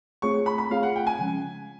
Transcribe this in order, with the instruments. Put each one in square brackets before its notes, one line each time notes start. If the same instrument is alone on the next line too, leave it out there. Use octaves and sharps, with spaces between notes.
[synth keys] A3 C4 F4 G#4 C#5 [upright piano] C#6
[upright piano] B5
B5
[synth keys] A3 C4 F4 G#4 C#5 [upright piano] F5
[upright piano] F#5
G5
G#5
[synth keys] C#3 F3 G#3 C#4